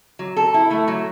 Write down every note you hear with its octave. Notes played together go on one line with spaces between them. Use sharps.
F#3
A4
E4
A3
F#3